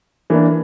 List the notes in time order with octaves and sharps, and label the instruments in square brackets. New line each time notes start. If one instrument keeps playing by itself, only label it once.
[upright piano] E3 A#3 D4